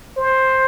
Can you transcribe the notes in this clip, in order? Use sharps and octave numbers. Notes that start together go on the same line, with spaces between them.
C5